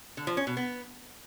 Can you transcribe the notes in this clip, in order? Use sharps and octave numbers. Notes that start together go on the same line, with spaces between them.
D3
F3
C#4
B2
B3